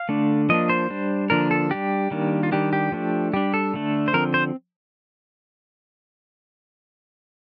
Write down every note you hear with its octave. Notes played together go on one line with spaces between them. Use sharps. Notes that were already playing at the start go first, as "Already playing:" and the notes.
Already playing: F5
D3 A3 D4
F3 A#3 D4 D#5
C5
G3 D4
D3 F3 A#3 D4 A#4
A4
G3 D4 G4
D#3 G3 A#3 D4
F4
D#3 G3 D4 G4
G4
F3 A3 D4
G3 D4 G4
A4
D3 A3 D4
C5
D3 F3 C4 A#4
C5